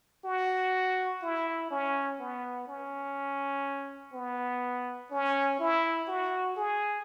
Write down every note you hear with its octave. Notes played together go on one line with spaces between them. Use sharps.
F#4
E4
C#4
B3
C#4
B3
C#4
E4
F#4
G#4